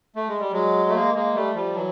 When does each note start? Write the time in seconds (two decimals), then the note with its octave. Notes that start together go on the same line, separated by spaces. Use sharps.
0.16 A3
0.28 G#3
0.40 G3
0.52 F#3 G#3
0.89 A3
0.95 G#3 A#3
1.14 G#3 A#3
1.34 G3 A3
1.55 F3 G3
1.74 E3 F#3